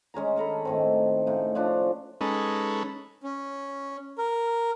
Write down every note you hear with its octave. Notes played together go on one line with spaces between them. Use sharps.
G#3 C#4 G#4 A#5
G#4 A4 A#5 B5
A2 D#3 C4
A2 C#3 D#4
F3 C#4 D4 F4
G#3 C#4 D#4 A4 B4
C#4
A#4